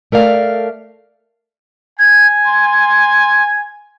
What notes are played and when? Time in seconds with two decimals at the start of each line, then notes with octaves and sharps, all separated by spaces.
0.12 A3 A#4 D5 F5
1.99 G#5 G#6
2.45 C6